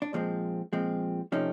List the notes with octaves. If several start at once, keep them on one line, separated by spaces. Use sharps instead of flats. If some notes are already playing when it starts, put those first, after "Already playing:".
D4
A#2 F3 G#3 C4 C#4
A#2 F3 G#3 C4
C3 F3 A3 C4 C#4 D#4